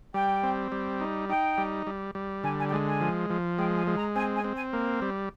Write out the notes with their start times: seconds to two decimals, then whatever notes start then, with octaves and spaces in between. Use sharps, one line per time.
0.14 G3 G5
0.43 C4
0.72 G3
1.01 D#4
1.29 D#4 G5
1.58 G3
1.87 G3
2.15 G3
2.44 D3 G#5
2.59 G#5
2.68 G5
2.72 G#3 G#5
2.87 G#5
3.01 F3
3.30 F3
3.58 G#3 G5
3.78 G#5
3.87 G#3
3.96 A#5
4.16 C4 G#5
4.35 G#5
4.44 C4
4.54 G#5
4.73 A#3
5.02 G3